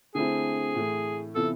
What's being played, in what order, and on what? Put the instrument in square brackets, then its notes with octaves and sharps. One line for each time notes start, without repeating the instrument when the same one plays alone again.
[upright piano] D3 A3 C4 E4 [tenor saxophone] G#4
[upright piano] A2 E3 A3
[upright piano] C3 E3 B3 F4 [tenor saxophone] A4